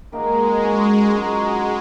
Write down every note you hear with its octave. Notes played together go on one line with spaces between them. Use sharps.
D#3 G#3 A#3 D#4 F#4
F#3 C#4 F#4
F#3 G#3 D#4 F#4